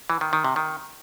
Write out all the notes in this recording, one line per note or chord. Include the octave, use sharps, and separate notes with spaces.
E3
D#3
D#3
C3
D#3